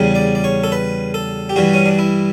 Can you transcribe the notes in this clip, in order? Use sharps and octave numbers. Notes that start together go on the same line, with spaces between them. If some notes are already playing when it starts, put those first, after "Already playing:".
Already playing: E2 C#3 G3
D5
D5
C#5
A4
B4
A4
G4
G2 E3 G3 F#4
C#4
D4
E4